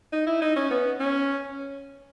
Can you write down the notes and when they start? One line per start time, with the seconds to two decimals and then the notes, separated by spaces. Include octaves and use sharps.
0.12 D#4
0.27 E4
0.42 D#4
0.56 C#4
0.71 B3
1.00 C#4